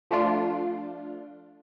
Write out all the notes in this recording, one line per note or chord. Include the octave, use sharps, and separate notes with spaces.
F3 A3 D4 F4